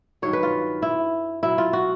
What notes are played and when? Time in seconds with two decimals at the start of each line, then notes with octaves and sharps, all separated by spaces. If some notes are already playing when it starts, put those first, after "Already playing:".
0.22 G2 D#3 F#3 C#5
0.33 B4
0.43 F4
0.82 E4
1.43 B2 F#3 E4
1.58 F4
1.73 F#4